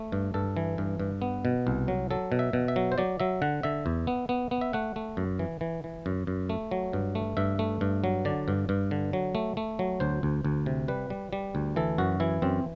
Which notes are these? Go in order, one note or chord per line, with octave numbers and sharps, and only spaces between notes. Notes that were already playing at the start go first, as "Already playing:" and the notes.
Already playing: A3
G2
G2 A4
E3
G2
G2
B3
B2
C2
F#3
F#3 A4
B2
E5
B2
E5
F#3
C5
F#3 D5
F#3 E5
D3 F#5
D3 E5
E2
B3
B3
B3
E5
A3 F#5
A3
F#2
E3
E3
E3
F#2
F#2
A3
F#3
G2
A3
G2 E5
A3
G2
F#3
D3 D5
G2
G2
D3
F#3
A3
A3
F#3
D2 C5
D2
D2
C3
G3 B4
G3
G3
D2
E3 A4
F#2 F#4
E3 E4
F#2 C4